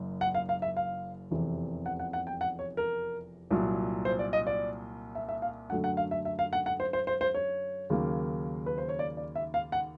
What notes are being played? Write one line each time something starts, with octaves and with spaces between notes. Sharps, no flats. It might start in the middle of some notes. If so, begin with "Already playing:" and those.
Already playing: F#1 F#2
F#5
F5
F5
E5
F5
F1 E2 C3 E3
F#5
F#5
F#5
G5
F#5
C#5
A#4
C2 A#2 F#3
C5
D5
D#5
D5
E5
E5
F5
F#2 D3 F#3 A3 D4 F#5
F#5
F5
E5
E5
F5
F#5
F#5
C5
C5
C5
C5
C#5
D#2 C#3 F#3 A#3
B4
C5
C#5
D5
D5
E5
F5
F#5